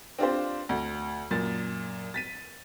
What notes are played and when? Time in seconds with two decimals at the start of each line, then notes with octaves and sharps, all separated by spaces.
0.19 C4 D4 F4 G4 C5
0.69 D2
1.31 F#2 A#2 A6
2.14 A6 B6 D#7